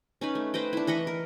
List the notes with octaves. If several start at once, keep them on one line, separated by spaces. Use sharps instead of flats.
C#4 D#4 B4
A3
B4 C5 D#5 G5
D4 E4
E3 D#5 B5 C#6
A#4